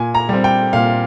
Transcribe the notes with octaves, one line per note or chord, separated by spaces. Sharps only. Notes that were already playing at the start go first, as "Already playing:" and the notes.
Already playing: A#2 G#5
A#5
G3 C4
G5
A#2 F5